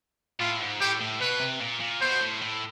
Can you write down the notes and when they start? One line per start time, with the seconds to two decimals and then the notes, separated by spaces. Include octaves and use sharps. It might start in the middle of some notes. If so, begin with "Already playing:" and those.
0.40 A2 F4
0.60 G#2
0.80 A2 G4
1.00 A2
1.20 B2 B4
1.40 C3
1.61 A#2
1.80 A#2
2.01 B2 C5
2.21 A2
2.42 A2